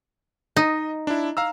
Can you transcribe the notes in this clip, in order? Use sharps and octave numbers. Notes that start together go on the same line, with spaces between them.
D#4 D#5
D4 E4
F5 A#5 E6